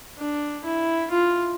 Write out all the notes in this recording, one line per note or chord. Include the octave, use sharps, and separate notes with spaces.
D4
E4
F4